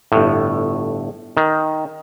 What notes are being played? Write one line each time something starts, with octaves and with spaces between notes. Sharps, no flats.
G1 A2
D#3